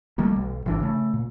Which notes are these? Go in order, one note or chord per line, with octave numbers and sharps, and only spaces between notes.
D#3 G3 A3 A#3
B1
G#1 E3 D4
C#3 A3
A#2